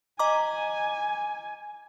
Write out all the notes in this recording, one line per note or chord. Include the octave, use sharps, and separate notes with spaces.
D#5 G#5 A#5 D6